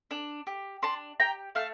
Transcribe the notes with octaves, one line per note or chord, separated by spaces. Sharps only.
D4
G4
D4 A5 C6
G4 G5 A#5
A3 F5 A5